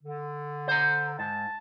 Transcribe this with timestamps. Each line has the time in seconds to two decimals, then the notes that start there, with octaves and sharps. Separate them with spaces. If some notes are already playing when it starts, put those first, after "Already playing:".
0.03 D3
0.68 C5 A#5
1.19 G#2 A5